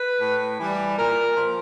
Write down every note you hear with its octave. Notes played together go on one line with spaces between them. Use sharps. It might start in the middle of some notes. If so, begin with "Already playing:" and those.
Already playing: B4
A2
E3 G3
A#2 A#4
F3